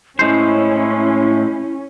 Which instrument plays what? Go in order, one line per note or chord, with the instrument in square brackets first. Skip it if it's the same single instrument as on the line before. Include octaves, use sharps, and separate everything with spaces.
[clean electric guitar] A2 G#3 C5 [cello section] C#4 [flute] E4